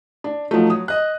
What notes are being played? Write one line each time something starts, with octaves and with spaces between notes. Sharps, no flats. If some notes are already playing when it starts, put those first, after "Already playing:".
D4
F3 F#3 A3 D#4
F#3 D#6
D#5 F#6